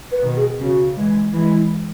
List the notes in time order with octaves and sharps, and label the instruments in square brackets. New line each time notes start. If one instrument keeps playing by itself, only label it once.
[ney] B4
[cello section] B2 D#3
[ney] G#4
[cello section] C#3 [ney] F#4
[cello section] E3 G#3
[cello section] E3 G#3 [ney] E4